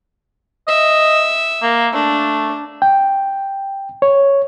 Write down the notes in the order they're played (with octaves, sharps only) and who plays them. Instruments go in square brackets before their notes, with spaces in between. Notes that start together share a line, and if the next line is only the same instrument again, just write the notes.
[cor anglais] D#5 [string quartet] E5
[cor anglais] A#3
[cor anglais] A3 [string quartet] D4
[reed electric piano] G5
C#5